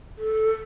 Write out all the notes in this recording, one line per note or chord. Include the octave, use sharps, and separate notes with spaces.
A4